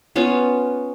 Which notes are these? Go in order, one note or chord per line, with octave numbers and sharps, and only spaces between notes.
B3 C#4 F4